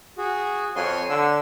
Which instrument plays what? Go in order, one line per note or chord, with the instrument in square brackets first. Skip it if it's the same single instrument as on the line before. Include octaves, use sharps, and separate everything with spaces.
[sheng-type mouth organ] F#4 G#4
[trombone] F2 [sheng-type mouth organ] C#5 G#5 C6
[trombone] D3 [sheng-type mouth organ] E6